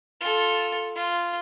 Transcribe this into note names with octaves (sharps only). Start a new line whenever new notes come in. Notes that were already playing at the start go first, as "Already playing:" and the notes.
F4 A4
F4